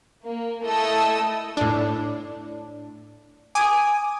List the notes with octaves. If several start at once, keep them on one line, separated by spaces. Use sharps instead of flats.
A#3
A3 E4 A4 D#5 D#6 E6
A2 D4
G#5 D6 D#6